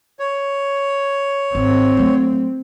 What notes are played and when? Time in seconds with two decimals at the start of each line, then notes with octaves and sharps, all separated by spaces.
0.19 C#5
1.55 G#1 C4
1.97 F#3 A3